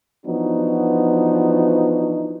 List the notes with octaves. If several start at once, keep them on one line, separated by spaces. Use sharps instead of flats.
E3 F3 B3 D4 D#4 F#4